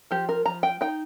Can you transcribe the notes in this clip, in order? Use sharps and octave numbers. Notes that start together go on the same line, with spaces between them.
F3 G4
A#4
F3 A#5
G5
D#4 G5